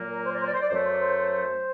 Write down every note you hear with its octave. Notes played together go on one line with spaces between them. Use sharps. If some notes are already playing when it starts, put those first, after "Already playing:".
Already playing: A#2 F#3 A#3
A#4
C5
D5
C5
D5
C5
D5
C5
F#2 F#3 A3 D5
C5
D5
C5
C5